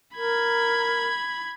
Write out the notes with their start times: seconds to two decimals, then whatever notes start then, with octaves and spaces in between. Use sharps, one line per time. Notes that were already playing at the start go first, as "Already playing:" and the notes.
0.16 A#4 B5 G#6